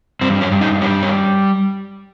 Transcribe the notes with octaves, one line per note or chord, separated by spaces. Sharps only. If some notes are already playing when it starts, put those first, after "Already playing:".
G2 C4
C#4
G2
D#4
G3 C#4
C#4